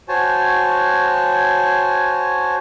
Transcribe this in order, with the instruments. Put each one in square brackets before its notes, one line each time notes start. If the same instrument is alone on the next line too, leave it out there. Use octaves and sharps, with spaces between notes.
[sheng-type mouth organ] F#4 C5 C#5 G#5 A5